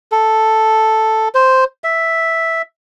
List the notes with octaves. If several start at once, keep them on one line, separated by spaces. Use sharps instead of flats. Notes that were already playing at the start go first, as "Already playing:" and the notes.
A4
C5
E5